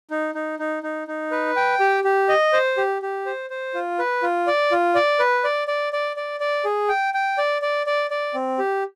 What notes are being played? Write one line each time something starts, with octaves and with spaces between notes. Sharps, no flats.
D#4
D#4
D#4
D#4
D#4
B4
G5
G4
G4
D#5
C5
G4
G4
C5
C5
F4
B4
F4
D5
F4
D5
B4
D5
D5
D5
D5
D5
G#4
G5
G5
D5
D5
D5
D5
C4
G4